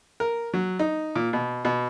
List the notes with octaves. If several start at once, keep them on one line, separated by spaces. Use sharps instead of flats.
A#4
F#3
D#4
A#2
B2
B2